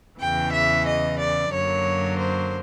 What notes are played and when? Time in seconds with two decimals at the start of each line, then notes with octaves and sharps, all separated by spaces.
0.20 E2 C#3 E3 G5
0.52 E5
0.86 D#5
1.19 D5
1.52 F#2 D3 F#3 A#3 C#5
2.18 C5